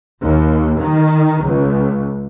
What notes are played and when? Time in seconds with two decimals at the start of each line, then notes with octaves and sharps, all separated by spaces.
0.23 D#2
0.81 D#3
1.43 C#2